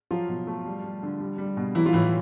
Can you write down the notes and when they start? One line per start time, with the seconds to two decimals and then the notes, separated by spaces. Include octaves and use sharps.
0.11 F3 F#3 F4
0.29 B2
0.47 A3
0.66 G3
0.83 G3
1.03 D3
1.20 G3
1.38 G3
1.57 B2
1.75 E3 F#3 E4
1.86 F4
1.93 A2 E3 E4